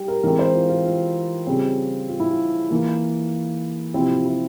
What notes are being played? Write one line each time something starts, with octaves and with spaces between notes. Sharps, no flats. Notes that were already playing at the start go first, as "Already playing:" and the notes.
Already playing: G3 G4
A#4
E3 G#3 C4 A#4
C5
F4
F4
F4
C#3 G3 C4
F4
E4
F4
E3 A#3
C3 F3 C4 E4
F4
E4